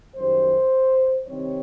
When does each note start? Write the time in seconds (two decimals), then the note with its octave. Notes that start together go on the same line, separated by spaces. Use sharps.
0.15 F#2 D#3 G3 C5
1.27 C3 D#3 G3 C4 C#5